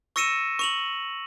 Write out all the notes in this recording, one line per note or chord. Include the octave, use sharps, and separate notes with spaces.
C#6 E6 A#6 C#7 D#7 E7
C#6 F7 F#7